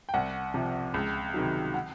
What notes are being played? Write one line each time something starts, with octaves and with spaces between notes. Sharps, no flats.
G5
C2 F#5
C3 F3
C#2
C3 D#3 F#3
F#5